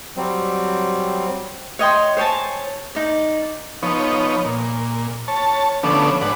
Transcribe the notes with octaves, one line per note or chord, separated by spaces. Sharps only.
F#3 G3 C4
C#5 D#5 G5 C6
C5 C#5 G#5 A5
D#4 D5
F3 B3 D#4 C#5
A#2
C#5 A5
D3 F3 A3 B3 C#4 D4
G#2 D4 B4 F#5